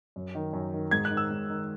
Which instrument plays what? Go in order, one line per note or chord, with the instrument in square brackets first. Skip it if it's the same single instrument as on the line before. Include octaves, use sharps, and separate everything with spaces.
[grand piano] F#2
D#3
F#2
D#3
G#2 G#6
F#6
D#3
E6
G#2
D#3